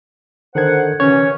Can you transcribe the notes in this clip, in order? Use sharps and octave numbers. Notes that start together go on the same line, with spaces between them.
D3 D#3 C5 F#5 G#6
C3 E3 C#4 C#5